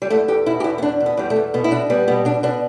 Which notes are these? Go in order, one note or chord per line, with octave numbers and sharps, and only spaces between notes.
G3
E2 A3
E2 G4
B2 E4
G4
E2 E4
B3
E2 D4
B2
B3
E2 G3
A3
E2
B2 B3
E4
B2 D4
G3 B3
B2 B3
B2 D4
B2 D4